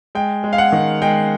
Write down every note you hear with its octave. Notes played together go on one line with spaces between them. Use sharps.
G#3 G5
G#3
F5
F#5
D#3
G#3 G5